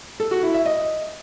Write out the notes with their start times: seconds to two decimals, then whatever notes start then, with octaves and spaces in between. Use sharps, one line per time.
0.20 A4
0.31 F#4
0.43 E4
0.54 E5
0.66 D#5